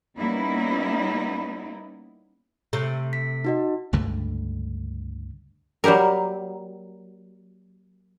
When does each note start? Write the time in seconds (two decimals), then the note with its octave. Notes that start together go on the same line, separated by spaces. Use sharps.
0.18 G3 A#3 B3 C#4 D#4 E4
2.73 C3 A3
3.13 B6
3.44 D#4 F#4 D#5
3.93 C#2 G2 D3 A3
5.84 F#3 G3 A#3 G4 A#4